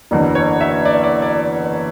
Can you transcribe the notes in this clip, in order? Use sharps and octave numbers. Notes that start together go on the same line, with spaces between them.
F#1 E2 D3
C#5
E5
D5
D5
D5